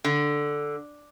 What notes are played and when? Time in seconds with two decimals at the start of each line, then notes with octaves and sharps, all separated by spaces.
0.04 D3